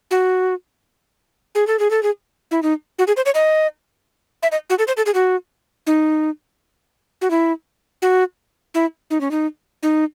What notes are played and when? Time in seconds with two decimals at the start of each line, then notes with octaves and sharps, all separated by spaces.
0.11 F#4
1.55 G#4
1.67 A4
1.79 G#4
1.91 A4
2.03 G#4
2.51 E4
2.63 D#4
2.99 F#4
3.07 G#4
3.17 C5
3.26 C#5
3.35 D#5
4.43 E5
4.52 D#5
4.70 F#4
4.79 A4
4.87 C5
4.97 A4
5.06 G#4
5.14 F#4
5.87 D#4
7.21 F#4
7.31 E4
8.02 F#4
8.74 E4
9.10 D#4
9.21 C#4
9.31 D#4
9.83 D#4